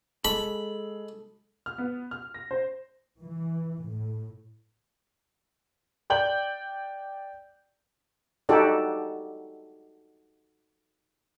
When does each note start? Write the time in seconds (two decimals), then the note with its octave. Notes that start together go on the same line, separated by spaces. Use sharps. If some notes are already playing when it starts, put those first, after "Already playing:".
0.25 G#3 A4 B5
1.66 F6
1.78 B3
2.11 F6
2.34 A#6
2.51 C5
3.20 E3
3.85 A2
6.10 D5 G5 G6 F#7
8.49 D#4 F#4 G4 A4 D5